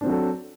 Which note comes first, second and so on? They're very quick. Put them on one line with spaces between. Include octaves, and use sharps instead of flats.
D4 C4 F#3 F#4 A4